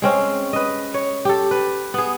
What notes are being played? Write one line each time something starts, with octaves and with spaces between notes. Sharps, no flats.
G#3 C4 C#4
B4 D#5
C#5
G4 A4
B4
B3 G#4